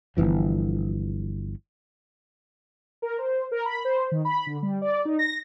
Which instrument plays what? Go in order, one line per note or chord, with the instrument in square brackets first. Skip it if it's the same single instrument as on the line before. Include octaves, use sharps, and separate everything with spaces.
[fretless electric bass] G1 F2 E3 F3
[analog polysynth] A#4
C5
A#4
B5
C5
D#3
B5
D3
G3
D5
D#4
A#6